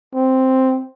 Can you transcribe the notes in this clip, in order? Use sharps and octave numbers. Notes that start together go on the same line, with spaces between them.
C4